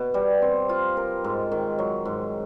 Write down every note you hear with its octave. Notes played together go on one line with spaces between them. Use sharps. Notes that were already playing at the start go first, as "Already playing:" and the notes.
Already playing: B2 B3
G3
C4
F4
A#4
G#2
D#3
F#3
G#2